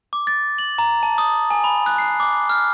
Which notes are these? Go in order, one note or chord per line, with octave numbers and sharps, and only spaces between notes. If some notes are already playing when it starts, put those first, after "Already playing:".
D6
A6
F#7
A#5
A5
D#6
G#5
B5
F#6
C7
D6
F6